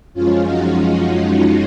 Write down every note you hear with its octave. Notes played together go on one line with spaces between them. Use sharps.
F#2 F3 G#3 C#4 F4
D#4 F#4
D#4 F#4